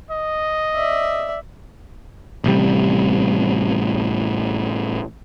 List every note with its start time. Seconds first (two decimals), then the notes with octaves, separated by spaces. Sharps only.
0.11 D#5
0.75 D5 E5
2.44 A1 C3 G3